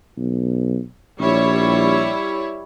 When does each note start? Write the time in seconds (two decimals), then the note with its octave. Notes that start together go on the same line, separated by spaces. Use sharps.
0.18 B1
1.20 A#1 G3 E4 C#5